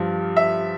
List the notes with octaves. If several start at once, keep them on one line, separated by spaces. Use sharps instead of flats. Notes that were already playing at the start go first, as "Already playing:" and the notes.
Already playing: G2 F3
E5